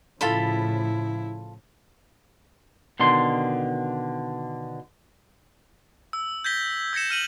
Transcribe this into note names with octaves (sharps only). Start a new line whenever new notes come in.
A2 C#3 F3 E4 F4 A4 B5
B2 D3 D#3 C6
E6
G6 G#6 A#6 B6 G7
E6 G#6 A#6 C#7 E7
F6 D#7 F#7